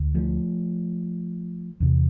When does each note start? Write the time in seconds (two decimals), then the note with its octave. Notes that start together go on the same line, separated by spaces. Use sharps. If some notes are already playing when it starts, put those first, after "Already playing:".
Already playing: D2
0.15 F3 A3
1.80 E2 C3